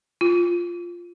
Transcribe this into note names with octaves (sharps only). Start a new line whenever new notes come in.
F4